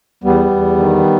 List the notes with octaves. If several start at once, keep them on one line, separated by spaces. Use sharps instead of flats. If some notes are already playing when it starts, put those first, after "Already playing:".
E2 G3 B3
E2
D#3